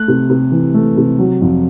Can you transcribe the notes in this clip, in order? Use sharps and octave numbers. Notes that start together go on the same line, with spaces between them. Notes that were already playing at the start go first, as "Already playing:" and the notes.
Already playing: A3 F#6
C3
C3
E3
A3
C3
F#3
F2